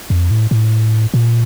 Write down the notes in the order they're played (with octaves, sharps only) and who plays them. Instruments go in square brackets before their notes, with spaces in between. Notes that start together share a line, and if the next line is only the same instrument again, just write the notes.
[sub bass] F2
A2
A2
A#2